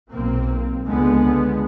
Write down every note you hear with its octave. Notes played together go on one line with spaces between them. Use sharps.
B1 A#3 C4
C#2 D3 G#3 B3